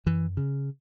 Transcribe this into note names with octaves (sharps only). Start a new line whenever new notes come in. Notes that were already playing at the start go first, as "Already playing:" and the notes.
F#2 E3
C#3